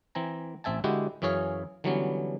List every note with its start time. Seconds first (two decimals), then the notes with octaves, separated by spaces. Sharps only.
0.15 E3 C4 G#5 A#5
0.64 A1 C4 E5 G#5 A5
0.84 D3 G#3 E4 F#4 G4
1.22 F#2 E3 C#4 G#4 C#5 F5
1.84 D3 E3 F#3 G3 B3 C#4